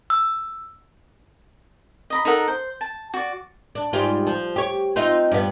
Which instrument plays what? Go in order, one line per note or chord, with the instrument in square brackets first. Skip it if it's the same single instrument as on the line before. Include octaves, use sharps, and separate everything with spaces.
[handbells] E6
[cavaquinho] D#5 A#5 B5
D#4 A4 A#4 F#5
C5
A5
F#4 D5
[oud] D4
G#2 G3 F4
F3
G4 C#5
C4 D#4 F4
G2 B3